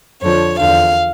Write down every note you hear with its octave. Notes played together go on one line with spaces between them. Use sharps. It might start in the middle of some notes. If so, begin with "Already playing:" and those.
F2 D3 F3 C#5
E2 D3 F3 F5